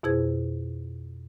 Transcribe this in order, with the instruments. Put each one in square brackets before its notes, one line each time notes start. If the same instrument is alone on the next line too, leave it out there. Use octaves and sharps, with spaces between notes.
[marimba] F2 B2 E4 G#4 C5 G#6